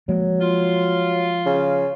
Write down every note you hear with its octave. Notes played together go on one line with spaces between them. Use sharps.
F3 F#3 G#3 A#3
F4
C#3